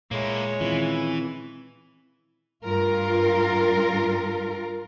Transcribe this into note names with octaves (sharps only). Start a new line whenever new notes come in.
A#2 G#3 A#3 E4 C#5
D#3 E3 C4 C#4 E4 F4 B5
G2 F4 A#4